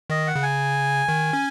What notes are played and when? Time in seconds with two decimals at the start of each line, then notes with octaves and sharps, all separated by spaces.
0.10 D#3 D#5
0.27 F#5
0.35 C#3
0.43 G#5
1.09 D#3
1.33 C#4